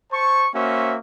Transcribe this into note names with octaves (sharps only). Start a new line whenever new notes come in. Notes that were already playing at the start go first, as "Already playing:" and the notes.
C5 A5 C#6
A#3 C#4 F#4 C5 E5